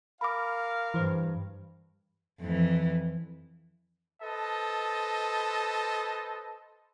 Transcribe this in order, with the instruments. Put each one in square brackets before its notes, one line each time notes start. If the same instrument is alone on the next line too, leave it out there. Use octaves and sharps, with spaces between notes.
[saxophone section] A#4 F5 [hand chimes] B5 D6
[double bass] G2 [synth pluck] E3 C5
[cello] F2 E3
[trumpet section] A4 B4 C5 D#5 A5